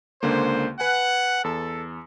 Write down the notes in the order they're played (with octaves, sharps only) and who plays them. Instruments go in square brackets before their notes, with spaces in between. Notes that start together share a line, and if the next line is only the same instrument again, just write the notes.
[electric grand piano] C#2 D3 A#3 [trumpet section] C5
[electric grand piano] B4 G#5 [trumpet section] F#5
[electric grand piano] E2 [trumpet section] A4